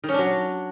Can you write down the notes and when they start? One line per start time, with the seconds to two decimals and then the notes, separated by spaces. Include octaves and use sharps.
0.04 D#3
0.09 C#4
0.14 D4
0.19 F#3